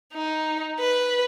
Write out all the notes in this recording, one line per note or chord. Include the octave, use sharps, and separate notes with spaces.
D#4
B4